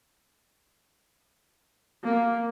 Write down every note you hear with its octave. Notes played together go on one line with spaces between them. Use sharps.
A#3